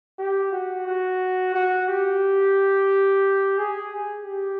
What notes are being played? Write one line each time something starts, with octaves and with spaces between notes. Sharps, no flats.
G4
F#4
F#4
F#4
G4
G#4
G4